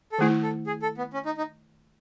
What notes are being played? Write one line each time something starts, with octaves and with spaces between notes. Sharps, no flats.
A4
D#3 A3 E4 G#4
A4
G#4
A4
B3
C#4
D#4
D#4